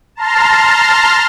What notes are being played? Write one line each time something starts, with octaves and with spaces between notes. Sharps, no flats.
A5 A#5 C6 F6